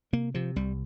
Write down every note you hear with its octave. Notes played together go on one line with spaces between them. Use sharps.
C3 A#3
C3 F3
C2 G3